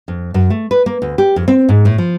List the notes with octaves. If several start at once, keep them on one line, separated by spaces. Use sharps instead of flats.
F2
F#2
A3
B4
A#3
D2
G4
F2
C4
G#2
A2
F3